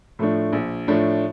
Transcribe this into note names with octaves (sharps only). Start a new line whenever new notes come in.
A2 F3 A3 D4
A#1
A2 F3 A3 D4